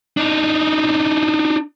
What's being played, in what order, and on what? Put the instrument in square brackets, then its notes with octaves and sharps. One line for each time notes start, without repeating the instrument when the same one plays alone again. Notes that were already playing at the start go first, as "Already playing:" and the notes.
[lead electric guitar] D4 D#4